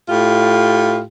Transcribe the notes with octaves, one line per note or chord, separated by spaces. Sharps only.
A2 F4 G4